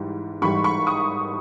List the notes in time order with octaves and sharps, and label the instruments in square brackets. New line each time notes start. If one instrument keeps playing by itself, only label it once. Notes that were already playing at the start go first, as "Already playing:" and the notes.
Already playing: [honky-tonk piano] G#2 E3 G3
G#2 E3 G3 B5 C#6
B5 C#6
C#6 D#6